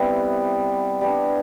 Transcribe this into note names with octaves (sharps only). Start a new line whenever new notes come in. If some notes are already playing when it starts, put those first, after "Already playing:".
Already playing: C3 G3 B3 E4
G3 B3 D4